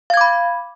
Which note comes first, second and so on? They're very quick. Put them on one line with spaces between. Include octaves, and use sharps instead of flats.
F5 G#6 D6 B5